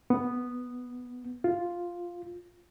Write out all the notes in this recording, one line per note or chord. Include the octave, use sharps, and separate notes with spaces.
B3
F4